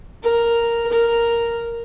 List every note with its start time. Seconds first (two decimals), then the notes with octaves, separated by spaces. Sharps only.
0.23 A#4
0.92 A#4